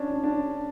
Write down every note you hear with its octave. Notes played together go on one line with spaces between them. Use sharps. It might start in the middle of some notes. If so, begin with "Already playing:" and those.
Already playing: C#4 D4
D4
D4